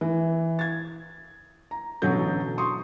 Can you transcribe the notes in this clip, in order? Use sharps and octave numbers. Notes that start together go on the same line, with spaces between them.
E3
G#6 A6
A#5
A1 B2 D3 F#3 A4 G6
C6 C#6 D#6